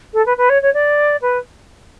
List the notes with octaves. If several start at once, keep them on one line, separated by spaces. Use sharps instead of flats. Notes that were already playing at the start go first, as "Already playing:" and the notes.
A4
B4
B4
C#5
C#5
D5
B4